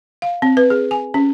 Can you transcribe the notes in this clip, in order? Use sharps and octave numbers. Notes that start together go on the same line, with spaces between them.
F5
C4
B4
G#4
G#5
C#4